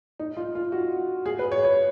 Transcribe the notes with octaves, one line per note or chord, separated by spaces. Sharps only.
D#4
F4
F4
F#4
G#4
B4
C#5
C#5